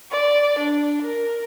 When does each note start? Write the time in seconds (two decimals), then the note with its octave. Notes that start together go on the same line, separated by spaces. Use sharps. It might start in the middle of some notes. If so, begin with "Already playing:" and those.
0.11 D5
0.59 D4
1.02 A#4